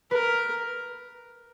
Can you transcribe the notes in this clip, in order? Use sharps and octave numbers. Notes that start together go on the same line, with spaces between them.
A#4 B4